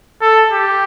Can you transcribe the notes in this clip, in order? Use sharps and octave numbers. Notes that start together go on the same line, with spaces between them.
A4
G4